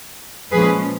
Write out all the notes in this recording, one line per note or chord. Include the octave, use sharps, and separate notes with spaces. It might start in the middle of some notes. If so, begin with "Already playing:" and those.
A#2 F3 G#3 C#4 G#4 B4